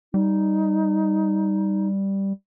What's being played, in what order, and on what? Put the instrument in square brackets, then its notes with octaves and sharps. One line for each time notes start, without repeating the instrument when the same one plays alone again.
[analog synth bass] G3 [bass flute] D#4